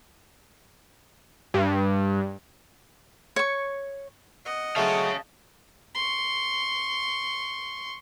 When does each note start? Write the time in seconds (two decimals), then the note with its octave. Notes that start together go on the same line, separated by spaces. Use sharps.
1.54 G2
3.36 C#5 C#6
4.45 D#5 F#5
4.76 F#3 G#3 A3 C#5 F5 A5
5.95 C6 C#6